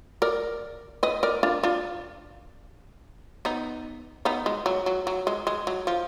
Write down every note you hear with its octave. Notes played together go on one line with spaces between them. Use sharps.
A#4 D5
B4 D#5
A#4 D5
D4 F4
D4 F4
B3 D#4
B3 D#4
G#3
F#3
F#3
F#3
G#3
G#3
F#3
F3